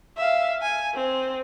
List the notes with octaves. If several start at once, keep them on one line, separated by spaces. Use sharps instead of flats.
E5 F5
G#5
C4